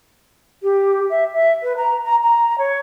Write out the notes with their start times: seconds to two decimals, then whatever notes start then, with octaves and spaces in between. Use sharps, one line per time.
0.63 G4
1.10 E5
1.34 E5
1.63 B4
1.77 A#5
2.05 A#5
2.24 A#5
2.58 C#5